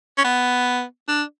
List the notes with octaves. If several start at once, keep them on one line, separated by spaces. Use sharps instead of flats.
C#4
B3
D4